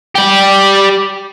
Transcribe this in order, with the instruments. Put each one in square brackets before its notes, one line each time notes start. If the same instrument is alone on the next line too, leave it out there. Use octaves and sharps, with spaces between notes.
[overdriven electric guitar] G4 D5